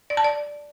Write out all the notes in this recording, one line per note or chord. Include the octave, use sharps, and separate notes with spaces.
D5
A5
D5